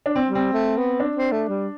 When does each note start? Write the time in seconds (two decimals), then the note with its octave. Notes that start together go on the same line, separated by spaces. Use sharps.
0.06 D4
0.15 C4
0.29 G3
0.35 C4
0.53 A3
0.77 B3
1.00 D4
1.17 C4
1.32 A3
1.48 G3